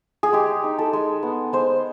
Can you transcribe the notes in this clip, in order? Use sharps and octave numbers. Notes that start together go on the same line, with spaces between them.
G#4
G#3 G4
D#4
A4
G#3
B3
G#3 C5